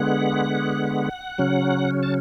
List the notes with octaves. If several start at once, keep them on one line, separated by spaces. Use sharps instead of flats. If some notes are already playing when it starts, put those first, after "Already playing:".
Already playing: D3 G#3 B3 F#5
C#3 F#3 C#4
A5